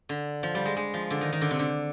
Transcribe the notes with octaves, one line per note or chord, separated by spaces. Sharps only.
D3
F3
G3
G#3
G#3
F3
D3
D#3
D#3
D3
C3
D3